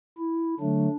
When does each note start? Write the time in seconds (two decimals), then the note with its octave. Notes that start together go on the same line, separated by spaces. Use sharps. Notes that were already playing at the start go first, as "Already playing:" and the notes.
0.18 E4
0.59 D3 F#3 A3 D4